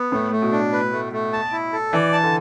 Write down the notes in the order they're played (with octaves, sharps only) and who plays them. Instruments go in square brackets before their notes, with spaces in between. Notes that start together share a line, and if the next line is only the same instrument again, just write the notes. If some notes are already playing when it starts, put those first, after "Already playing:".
Already playing: [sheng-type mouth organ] B3
[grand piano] A2 [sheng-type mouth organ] A3
[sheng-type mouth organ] A3
[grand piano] B2
[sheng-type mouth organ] D4
B4
A3
A3
A5
E4
A4
[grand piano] E3 [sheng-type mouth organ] D5
[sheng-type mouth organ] A5
[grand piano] D3